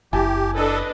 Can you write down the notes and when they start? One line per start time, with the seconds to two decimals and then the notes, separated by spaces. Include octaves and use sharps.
0.13 F#1 E4 G4 G#5 A5
0.55 D4 A4 B4 D#5